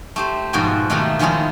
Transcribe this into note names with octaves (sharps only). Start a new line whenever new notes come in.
A3 G4 C5
G#2 B2 F3 F#4 G5 G#5
B2 D#3 A3 A#3 D#4 G4
D#3 F3 G#3 C#4 D#4 E4